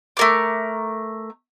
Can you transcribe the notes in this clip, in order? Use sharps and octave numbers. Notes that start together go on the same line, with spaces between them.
A3 A#4 D6